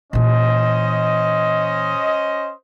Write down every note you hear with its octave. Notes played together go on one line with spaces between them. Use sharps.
A#2 E3 C#4 C5 D#5